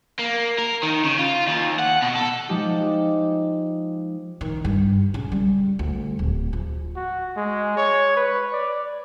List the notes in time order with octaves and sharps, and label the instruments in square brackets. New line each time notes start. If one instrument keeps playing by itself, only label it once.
[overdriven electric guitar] A#3
A#4
D#3
C#3
F4
D#2
F#5
B2
A4
[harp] F3 G#3 D#4 G4
[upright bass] D#3
G2
C#3
G3
D2
D1
F3
[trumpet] F#4
G#3
C#5
B4
D5